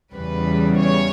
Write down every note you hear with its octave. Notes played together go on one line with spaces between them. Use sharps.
E2 C#3 E3 G3 B4
C#5